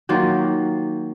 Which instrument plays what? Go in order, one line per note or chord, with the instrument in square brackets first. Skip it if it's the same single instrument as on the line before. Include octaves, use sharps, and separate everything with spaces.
[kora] D#3 F#3 A#3 F4